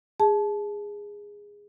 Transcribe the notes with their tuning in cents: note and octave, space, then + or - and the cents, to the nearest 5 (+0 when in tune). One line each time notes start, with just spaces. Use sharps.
G#4 -15 A5 -25